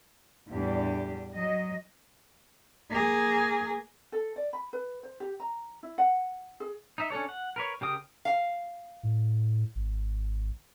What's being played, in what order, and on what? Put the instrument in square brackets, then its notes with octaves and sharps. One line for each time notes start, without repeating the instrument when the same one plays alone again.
[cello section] E2 A2 G3 D4 G4
F#3 D#5
[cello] A#3 G#4
[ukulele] A4
D5
B5
B4
C5
G4
A#5
E4
F#5
G#4
[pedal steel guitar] D#4 E5
C#4 D4 A4 C#5
F#5
A#4 B4 C#5
C#3 G4 A#4 G5 D#6
[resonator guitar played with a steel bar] F5
[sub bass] A2
G#1